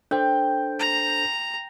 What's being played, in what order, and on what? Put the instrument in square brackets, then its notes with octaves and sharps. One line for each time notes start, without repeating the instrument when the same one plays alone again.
[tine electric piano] D4 A4 C5 [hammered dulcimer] G5
[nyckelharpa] A#5